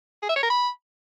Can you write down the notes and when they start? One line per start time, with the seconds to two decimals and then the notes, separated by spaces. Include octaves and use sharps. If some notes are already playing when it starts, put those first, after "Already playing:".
0.22 G#4
0.29 E5
0.36 C#5
0.43 A#4
0.50 B5